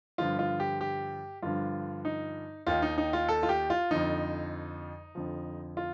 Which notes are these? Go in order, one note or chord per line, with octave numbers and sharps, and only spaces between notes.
G2 D3 F3 F4
F4
G4
G4
G2 D3 F3 F4
D#4
D#2 D#3 F4
D#4
D#4
F4
A4
F4
G4
F4
F2 D3 F3 D#4
F2 D3 F3
F4